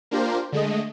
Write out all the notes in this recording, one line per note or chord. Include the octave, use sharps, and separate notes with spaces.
A#3 D4 F4 G4 A#4 C5
D3 G#3 A3 D#5